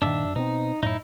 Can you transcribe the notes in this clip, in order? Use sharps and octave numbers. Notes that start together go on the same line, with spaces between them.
G2 A#2 D#3 D4 E5
F#2
B2 C4 D#4
F#2 A2 D#4 E4